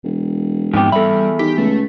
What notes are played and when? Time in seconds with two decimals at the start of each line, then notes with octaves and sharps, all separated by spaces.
0.04 E1
0.73 F2 G#2 B2 G4
0.92 E2 G3 A4 E5 B5
1.39 D#3 G4 B6
1.58 C#2 A3